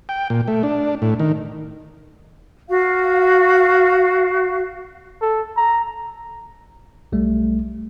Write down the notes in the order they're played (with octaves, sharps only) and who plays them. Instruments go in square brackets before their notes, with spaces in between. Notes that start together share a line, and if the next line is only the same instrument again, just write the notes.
[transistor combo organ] G5
A#2
A3
D4
A2
D#3
[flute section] F#4 F5
[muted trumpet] A4
A#5
[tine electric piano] B1 G3 A3